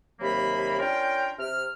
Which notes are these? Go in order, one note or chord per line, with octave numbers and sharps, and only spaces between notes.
D#2 C3 F#3 A#3 B5
C#4 D4 F4 A#4 G5
C3 F6